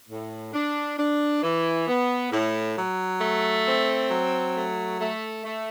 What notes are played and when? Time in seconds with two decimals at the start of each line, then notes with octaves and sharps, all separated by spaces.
0.09 A2
0.53 D4
0.98 D4
1.42 E3
1.88 B3
2.32 A2
2.77 F#3
3.21 A3
3.66 C4
4.11 F#3
4.55 A3
5.00 A3
5.45 A3